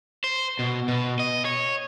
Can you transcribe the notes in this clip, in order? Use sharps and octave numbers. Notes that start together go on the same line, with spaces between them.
C5
B2
B2
D#5
C#5